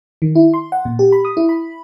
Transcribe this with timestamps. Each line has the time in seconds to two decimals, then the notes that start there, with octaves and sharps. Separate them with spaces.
0.22 D#3
0.35 E4
0.54 C6
0.72 F#5
0.85 A#2
0.99 G4
1.12 B5
1.25 D#6
1.37 E4
1.49 B5